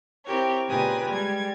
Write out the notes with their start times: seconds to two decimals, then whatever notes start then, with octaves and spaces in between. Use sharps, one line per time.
0.25 C4 E4 G4 A#4 C#5
0.68 A#2 C#3 G4 B4 G#5 D#6
1.11 G3 G#3 G#6